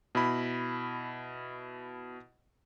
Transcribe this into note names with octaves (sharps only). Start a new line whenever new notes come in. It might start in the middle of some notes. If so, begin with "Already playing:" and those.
B2 E4 B5